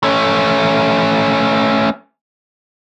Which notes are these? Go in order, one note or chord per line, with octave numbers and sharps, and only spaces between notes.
A3 C#4